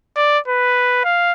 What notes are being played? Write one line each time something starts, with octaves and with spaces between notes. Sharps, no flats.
D5
B4
F5